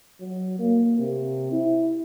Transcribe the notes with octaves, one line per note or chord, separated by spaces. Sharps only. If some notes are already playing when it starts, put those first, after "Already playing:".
F#3
A#3
C3
E4